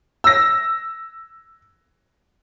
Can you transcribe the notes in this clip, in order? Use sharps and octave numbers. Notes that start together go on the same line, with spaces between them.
E6 A#6